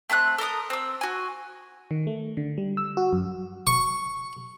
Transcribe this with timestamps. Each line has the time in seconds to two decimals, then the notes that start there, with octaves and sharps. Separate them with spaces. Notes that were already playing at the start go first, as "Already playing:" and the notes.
0.10 A3 C4 A5 F#6
0.38 A4 A#4 A#5 D#6
0.70 C4 E6
1.01 F#4 G#5
1.91 D#3
2.07 A3
2.37 D3
2.58 G3
2.77 E6
2.97 F#4
3.13 F#2
3.67 C#6